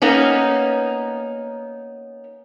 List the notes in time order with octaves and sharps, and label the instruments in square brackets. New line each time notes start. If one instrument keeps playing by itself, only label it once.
[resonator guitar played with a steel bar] A#3 B3 C#4 D#4